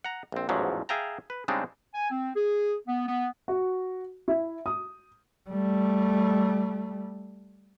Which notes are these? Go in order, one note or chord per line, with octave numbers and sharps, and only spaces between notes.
F#5 A#5
A#1 C4
A1 E2 G#2 F3 F#3
G#4 E5 F5 G5 A5 A#5
B4
C#3 G3 G#3 C4 D4 D#4
G#5
C4
G#4
B3
B3
F#4
E4
D#6
G3 A3